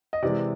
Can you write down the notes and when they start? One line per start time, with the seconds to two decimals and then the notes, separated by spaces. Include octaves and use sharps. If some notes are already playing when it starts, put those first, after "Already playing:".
0.13 D#5
0.22 C3 E3 G#3 D5